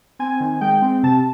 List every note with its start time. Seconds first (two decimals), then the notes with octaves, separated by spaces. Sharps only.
0.19 C4 G#5
0.40 D#3
0.61 G#3 G5
0.82 C4
1.03 C3 A5